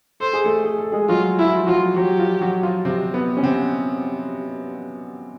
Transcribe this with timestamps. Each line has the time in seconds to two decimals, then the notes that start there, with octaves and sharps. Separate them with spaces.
0.20 A4 C5
0.33 G#4
0.45 A3 A4
0.64 G#4
0.78 A4
0.92 G#3 G#4
1.09 F#3 F4 F#4
1.39 E4 F4
1.48 F#4
1.56 F3 F4
1.67 F#3 F4 F#4
1.96 F#3 F#4 G4
2.19 F3 F4
2.41 F#3 F#4
2.63 F3 F4
2.85 C3 C4
3.14 B3
3.37 C#4
3.43 C3 C4